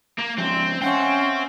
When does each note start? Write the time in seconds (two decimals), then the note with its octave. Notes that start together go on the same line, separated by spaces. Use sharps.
0.18 A#3
0.38 F3 G#3 C4 C#4
0.82 C4 C#4 E5 F#5 G5